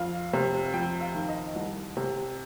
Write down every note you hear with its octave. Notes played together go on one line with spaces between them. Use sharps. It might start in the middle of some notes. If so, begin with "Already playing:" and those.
Already playing: F2 F5
C3
F2 G5
F5
D#3
D#5
C2
C3